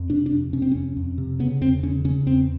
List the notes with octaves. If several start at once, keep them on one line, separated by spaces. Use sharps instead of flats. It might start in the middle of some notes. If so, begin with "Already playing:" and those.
Already playing: F2
C3 D4
D4
F2
C3 C#4
C4
F2 C#4
F2
C3
C#3 B3
E2 C4
C#3 C#4
C#3 C#4
E2 C4